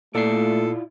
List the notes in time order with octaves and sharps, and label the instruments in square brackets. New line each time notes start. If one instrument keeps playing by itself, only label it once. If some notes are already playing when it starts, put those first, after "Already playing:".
[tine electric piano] A#2 C7 [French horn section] A3 [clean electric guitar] E4 F4 D5 [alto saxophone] A4